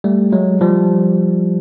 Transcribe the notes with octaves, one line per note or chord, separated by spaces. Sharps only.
G3 A3
F#3 G#3
F3 G3